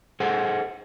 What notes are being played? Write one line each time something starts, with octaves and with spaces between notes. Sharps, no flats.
G#4 A4 C5 F#5